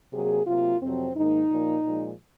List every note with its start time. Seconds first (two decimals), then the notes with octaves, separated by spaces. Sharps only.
0.13 C3 F#3 A#3 G#4
0.47 C3 F#3 A#3 F4
0.82 F2 C3 F#3 C4
1.15 G#2 D#3 A#3 D#4
1.50 A#2 F3 A#3
1.84 A#2 F3 G#3